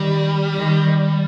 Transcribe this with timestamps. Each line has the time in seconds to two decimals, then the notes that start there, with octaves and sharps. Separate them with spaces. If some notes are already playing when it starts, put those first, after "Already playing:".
Already playing: D#3 G3
0.55 D#3